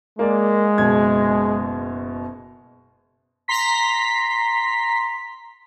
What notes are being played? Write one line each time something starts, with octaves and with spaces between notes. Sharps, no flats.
G#3 A#3 D5
F#1 B2 G#6
A#5 C6 B6